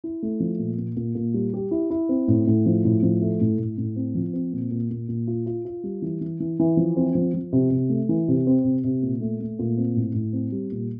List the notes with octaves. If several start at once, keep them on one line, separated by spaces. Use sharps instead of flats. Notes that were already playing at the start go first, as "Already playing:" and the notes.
E4
A3
F3
A#2
A#2
A#2
A#2
G3
G4
E4
E4
C4
A2
A2
F3
A2
F3
A3
A2
A2
A2
C4
F3
C4
A#2
A#2
A#2
A#2
F4
F4
F4
G3
E3
E3
E3
E3
F3
C4
F3
F3
C3
C3
A3
E3
C3
C4
C3
C3
A#2
A3
A3
A#2
C4
A2
A2
C4
G3
A#2